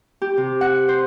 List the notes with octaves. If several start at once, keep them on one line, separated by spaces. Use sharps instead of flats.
G4
C3
F#5
C5